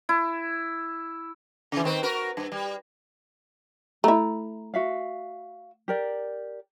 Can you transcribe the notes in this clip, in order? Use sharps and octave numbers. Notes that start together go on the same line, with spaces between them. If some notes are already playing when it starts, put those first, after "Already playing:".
E4
C#3 E3
D#3 C4 B4
F#4 A#4 B4
G2
G3
A3 E4 A#5
F#4 E5 F5
G4 A#4 D5